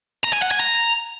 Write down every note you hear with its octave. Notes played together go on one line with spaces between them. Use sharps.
A#5
G#5
F#5
G#5
A#5